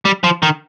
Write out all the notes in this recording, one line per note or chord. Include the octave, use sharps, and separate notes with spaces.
G3
F3
D#3